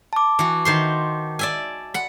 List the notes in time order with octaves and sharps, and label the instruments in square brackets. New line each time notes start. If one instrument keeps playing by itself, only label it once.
[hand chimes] A5 D6
[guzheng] E3 F#4
D#3 C5 C6
D5 E5 G#5
F#5 B5